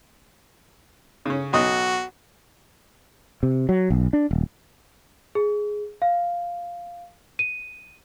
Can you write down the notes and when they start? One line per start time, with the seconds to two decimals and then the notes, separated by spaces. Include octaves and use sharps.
1.26 C#3 C#4
1.53 B1 F#4 D#5 D#6
3.43 C3
3.69 F#3
3.90 B1
4.13 D4
4.31 D#1
5.35 G#4
6.02 F5
7.39 D#7